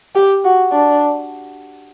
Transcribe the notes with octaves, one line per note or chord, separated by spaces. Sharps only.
G4
F#4
D4